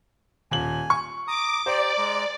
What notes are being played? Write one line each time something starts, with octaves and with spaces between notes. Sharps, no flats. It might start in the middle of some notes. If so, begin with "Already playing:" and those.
D#1 G#5 F#7
C#6
A#5 D6 D#6
G4 C5 D5 A#5
G#3 A#5